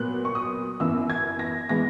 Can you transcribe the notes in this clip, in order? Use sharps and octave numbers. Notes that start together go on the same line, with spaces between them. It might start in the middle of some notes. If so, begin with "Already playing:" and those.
Already playing: A#2 F#3 B3 F#6
C#6
D#6
F#2 E3 B3 E6
G#6
A#6
E3 G#3 B3 A#6